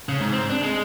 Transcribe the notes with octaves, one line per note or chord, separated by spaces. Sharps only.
C#3
G#2
C4
D4
G#3